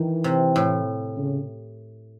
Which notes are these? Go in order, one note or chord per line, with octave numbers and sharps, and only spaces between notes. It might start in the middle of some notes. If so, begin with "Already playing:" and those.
Already playing: D#3 E3
C3
A2
C#3